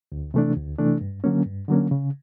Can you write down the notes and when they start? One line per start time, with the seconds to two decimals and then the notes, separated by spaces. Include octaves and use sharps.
0.12 D2
0.34 C3 E3 A3 D4
0.57 D2
0.79 C3 E3 A3 D4
1.01 G2
1.24 D3 F#3 A#3 C#4
1.46 G2
1.68 D3 F#3 A#3 C#4
1.91 C#3